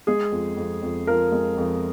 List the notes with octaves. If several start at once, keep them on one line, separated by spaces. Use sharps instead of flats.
G#3 G#4
F2
F2
F2
F3 A#4
G#3
F2